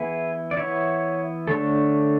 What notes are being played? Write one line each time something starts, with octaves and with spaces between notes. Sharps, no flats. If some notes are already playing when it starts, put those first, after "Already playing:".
Already playing: E3 B3 E4 G#4 B4
D5
E3 B3 E4 C#5 E5
D3 A3 D4 A4 C#5